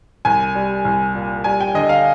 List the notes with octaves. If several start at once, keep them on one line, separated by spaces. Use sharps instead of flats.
C2 G#5
G3
C2
A#2
G3 G#5
G5
D3 D#5
F5